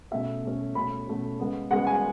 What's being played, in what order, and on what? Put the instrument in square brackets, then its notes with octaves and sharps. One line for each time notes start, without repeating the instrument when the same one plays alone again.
[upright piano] B2 A3 C#4 E5
B2 A3 C#4
B2 A3 C#4 B5
B2 A3 C#4
C#3 G#3 B3
C#3 G#3 B3 F#5
G#5